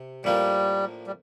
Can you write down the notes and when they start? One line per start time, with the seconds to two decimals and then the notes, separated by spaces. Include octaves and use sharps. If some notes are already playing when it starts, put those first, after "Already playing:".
Already playing: C3
0.24 A2 F3 G3 A#3 D4
1.07 G3